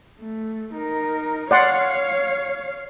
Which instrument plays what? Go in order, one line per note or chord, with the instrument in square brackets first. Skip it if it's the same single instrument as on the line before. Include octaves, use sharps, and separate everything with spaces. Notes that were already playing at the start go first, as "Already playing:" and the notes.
[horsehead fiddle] A3
D#4 A#4
[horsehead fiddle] C#5 F5 [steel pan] D5 F#5 C6